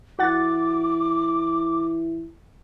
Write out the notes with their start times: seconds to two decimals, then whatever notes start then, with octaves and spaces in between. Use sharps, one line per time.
0.19 E3 F#4 F#5 D6 A6